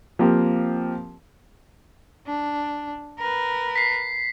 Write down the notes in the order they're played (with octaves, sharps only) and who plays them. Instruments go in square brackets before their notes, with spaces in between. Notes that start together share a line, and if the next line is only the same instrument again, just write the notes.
[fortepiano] F3 A#3 C4 G4
[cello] D4
A#4 B4
[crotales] B6 C7